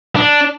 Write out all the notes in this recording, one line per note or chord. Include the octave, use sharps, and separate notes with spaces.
D4